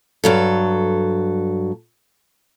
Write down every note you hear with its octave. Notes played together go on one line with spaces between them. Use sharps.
G2 F#3 A4